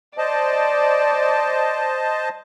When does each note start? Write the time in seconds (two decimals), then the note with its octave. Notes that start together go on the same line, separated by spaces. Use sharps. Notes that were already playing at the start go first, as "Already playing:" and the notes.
0.18 C5 D5 D#5 A5